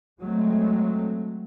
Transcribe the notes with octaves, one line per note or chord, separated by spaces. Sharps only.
F#3 G#3 A3 C4